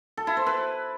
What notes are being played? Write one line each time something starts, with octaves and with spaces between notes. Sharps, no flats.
A4
E4
C5
B4